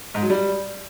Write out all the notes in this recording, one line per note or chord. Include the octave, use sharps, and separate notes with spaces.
G#2
F#3
G3